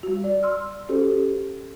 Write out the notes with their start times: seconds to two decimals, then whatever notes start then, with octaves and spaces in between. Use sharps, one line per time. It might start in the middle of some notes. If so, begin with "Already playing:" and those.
0.03 G3 F#4
0.24 D5
0.43 C6 E6 F6
0.89 C#4 F#4 G4 A4 C5